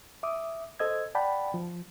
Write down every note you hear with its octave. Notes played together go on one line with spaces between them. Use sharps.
E5 D6 D#6
A4 C5 D#5 E6 G#6
D5 F#5 G5 A5 B5
F3